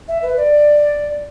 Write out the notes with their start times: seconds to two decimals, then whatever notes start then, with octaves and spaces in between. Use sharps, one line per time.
0.08 E5
0.22 B4
0.37 D5